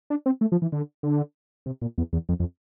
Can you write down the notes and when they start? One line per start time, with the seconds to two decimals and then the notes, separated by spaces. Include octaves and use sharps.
0.10 D4
0.26 C4
0.41 A3
0.52 F3
0.62 E3
0.72 D3
1.03 D3
1.66 C3
1.82 A#2
1.98 E2
2.13 E2
2.29 F2
2.40 F2